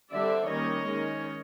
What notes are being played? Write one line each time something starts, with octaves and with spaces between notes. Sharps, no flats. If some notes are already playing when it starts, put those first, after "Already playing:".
D3 G3 C4 D5 E5
D#3 G3 A#3 C#4 C#5 D#5
D#3 G#3 C#4